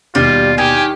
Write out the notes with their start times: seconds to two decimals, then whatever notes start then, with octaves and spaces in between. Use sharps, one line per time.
0.15 D#2 B2 G3 F4
0.58 D#3 G4 G#5